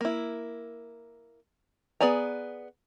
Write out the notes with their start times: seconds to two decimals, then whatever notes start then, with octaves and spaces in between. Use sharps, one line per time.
0.01 A#3 E4
2.00 B3 G#4 D5 G#5 A#5